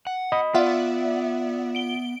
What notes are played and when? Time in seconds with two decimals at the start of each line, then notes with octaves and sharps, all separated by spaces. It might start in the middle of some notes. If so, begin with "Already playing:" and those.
0.07 F#5
0.32 D#5 B5
0.55 B3 F4 D5 E5 F#5
1.75 D7 G7